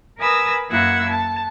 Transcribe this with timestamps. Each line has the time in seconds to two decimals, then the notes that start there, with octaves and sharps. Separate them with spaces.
0.18 A#4 B4 G#5 D#6 E6 A#6
0.70 F#2 A#3 E4 F#5 E6 G#6
1.09 A5